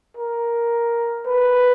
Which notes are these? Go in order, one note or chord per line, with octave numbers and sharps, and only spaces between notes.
A#4
B4